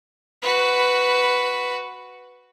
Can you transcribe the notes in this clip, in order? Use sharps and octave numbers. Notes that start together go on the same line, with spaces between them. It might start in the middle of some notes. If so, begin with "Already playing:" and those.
F#4 B4